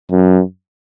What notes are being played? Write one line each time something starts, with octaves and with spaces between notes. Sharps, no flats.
F#2